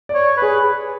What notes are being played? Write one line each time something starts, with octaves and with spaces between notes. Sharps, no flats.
C#5 D5
G#4 B4